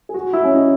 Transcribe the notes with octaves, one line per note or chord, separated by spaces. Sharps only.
G#4
F#4
E4
C#4
D#4